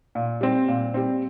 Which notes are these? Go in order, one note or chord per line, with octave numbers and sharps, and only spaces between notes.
A#2
G3 C4
A#2
G3 C4